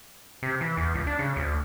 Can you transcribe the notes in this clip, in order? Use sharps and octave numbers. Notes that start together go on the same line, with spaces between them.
C3
E3
E2
C#2
D4
C#3
D2